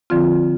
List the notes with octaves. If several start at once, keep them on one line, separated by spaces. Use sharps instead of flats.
D3 F3 C4 F4